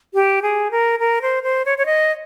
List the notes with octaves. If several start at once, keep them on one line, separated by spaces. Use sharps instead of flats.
G4
G#4
A#4
A#4
C5
C5
C#5
C#5
D#5